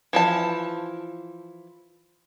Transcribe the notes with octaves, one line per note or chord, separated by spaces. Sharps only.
E3 F3 A5